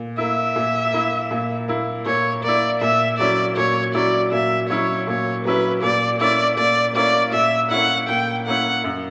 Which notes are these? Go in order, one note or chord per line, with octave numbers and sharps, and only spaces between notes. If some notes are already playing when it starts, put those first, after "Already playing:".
Already playing: A#2
A#3 E4 E5
A#2
A#3 E4
A#2
A#3 E4
A#2 C#5
A#3 E4 D5
A#2 E5
F#3 C#4 E4 D5
A#2 C#5
F#3 C#4 E4 D5
A#2 E5
F#3 C#4 E4 C#5
A#2 C#5
F#3 C#4 E4 B4
A#2 D5
A#3 C#4 E4 D5
A#2 D5
A#3 C#4 E4 D5
A#2 E5
A#3 C#4 E4 F#5
A#2 G5
A#3 C#4 E4 F#5
F#2